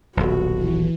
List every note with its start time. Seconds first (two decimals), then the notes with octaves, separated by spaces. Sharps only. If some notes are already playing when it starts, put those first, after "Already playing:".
0.17 D#1 B1 F#4
0.54 E3